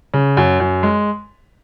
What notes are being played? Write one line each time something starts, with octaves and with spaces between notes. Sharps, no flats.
C#3
F#2
F#2
G#3